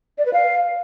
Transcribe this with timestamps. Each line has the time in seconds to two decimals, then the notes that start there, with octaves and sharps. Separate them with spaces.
0.18 D5
0.26 B4
0.33 F5